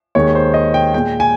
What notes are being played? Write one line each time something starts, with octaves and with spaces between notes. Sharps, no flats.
D#2 D#3 G#3 C#5
C5
D#5
G5
A#2 G#3 G5
G#5